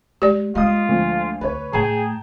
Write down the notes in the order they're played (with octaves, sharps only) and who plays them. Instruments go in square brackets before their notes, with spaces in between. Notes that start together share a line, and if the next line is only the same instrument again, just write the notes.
[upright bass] G#3 [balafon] G4 D5
[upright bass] G#3 A#3 [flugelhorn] F4 [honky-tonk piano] D#5 F5 D#6
[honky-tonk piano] D2 F3
[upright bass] D2 [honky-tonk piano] B4 C#5
[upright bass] A2 A3 [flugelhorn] G#4 [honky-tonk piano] G5 A5 A#5